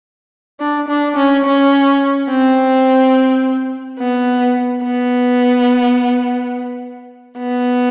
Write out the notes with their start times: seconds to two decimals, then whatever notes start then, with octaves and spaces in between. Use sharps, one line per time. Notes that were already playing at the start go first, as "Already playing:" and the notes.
0.60 D4
0.88 D4
1.16 C#4
1.45 C#4
2.29 C4
3.99 B3
4.84 B3
7.38 B3